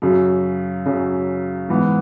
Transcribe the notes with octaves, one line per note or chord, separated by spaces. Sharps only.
F#2 C#3 F#3
F#2 C#3 F#3
G#2 E3 B3